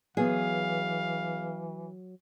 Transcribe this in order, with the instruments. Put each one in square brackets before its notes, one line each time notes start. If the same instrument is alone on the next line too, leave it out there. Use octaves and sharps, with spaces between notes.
[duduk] E3 [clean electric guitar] F#3 [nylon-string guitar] B3 G#4 [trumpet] F5